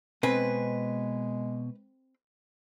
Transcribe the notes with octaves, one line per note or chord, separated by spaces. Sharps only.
B2 G#3 C4 B4 D#5 G#5